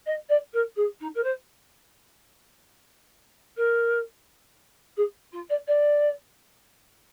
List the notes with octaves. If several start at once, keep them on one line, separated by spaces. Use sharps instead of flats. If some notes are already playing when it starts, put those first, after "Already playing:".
D#5
D5
A#4
G#4
D#4
A#4
C5
A#4
G#4
F4
D5
D5